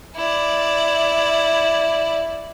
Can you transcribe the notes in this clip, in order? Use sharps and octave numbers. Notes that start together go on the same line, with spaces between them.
E4 D5